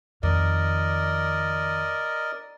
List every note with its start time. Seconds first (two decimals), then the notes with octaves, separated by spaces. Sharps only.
0.23 F2 D#3 A#4 D5 D#5